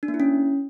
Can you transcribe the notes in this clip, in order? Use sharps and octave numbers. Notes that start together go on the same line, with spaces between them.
D4
A#3
E4
C#4